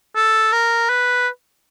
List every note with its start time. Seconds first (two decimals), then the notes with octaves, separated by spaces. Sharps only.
0.16 A4
0.52 A#4
0.89 B4